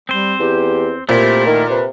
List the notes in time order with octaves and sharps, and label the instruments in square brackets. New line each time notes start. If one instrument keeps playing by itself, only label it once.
[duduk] G3 [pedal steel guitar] C4 C5
[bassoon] E2 [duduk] G4
[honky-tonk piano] A#2 [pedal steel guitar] A3 E4 [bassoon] C4 [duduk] G4
[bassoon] D#3 [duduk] A#4
[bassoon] C3 [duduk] B4